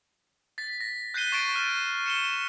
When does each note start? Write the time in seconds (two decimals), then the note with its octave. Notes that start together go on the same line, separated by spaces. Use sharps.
0.58 A6 B6
0.81 A#6
1.14 F#6 G6 B6 C7 D#7 G7
1.32 C#6 A6 D7
1.55 F6 D#7
2.06 C#7 E7 G7